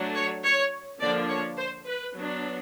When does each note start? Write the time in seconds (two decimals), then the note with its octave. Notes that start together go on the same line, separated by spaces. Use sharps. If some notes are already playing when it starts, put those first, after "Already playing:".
Already playing: F#3 A3 D4
0.16 C#5
0.44 C#5
1.01 D3 F3 A#3 D4 D5
1.29 C#5
1.57 C5
1.86 B4
2.15 F#3 B3 D4